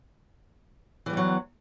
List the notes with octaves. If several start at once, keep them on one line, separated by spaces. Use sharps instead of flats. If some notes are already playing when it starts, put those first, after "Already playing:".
E2 E3 F#3 G3